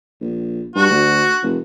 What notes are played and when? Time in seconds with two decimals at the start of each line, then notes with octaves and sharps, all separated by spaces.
0.21 A#1
0.76 G2 F#4
0.90 D2
1.43 F1